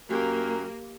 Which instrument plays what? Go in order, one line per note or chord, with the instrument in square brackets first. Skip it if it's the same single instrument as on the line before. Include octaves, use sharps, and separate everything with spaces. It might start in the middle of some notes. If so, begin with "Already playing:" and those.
[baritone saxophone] F#2 [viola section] A#3 [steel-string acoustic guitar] G4 [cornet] A#4